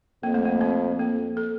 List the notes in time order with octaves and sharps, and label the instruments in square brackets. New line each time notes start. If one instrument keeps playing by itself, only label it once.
[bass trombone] F2 [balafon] A#3
[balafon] A3
A#3
C4
[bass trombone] F2 [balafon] A#3
[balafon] A4